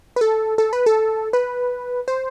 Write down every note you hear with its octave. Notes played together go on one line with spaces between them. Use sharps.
B4
A4
A4
B4
A4
B4
C5